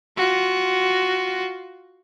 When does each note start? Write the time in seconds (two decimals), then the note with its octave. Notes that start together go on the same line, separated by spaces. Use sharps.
0.17 F4 F#4